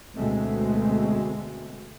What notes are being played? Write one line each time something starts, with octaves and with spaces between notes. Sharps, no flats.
D2 B2 G#3 A3 C4